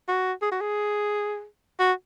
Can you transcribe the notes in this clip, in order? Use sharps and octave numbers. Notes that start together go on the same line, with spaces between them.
F#4
G#4
F#4
G#4
F#4